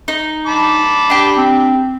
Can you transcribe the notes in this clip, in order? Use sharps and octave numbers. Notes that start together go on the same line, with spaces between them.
D#4
A5 B5 D6
D4 G4
C4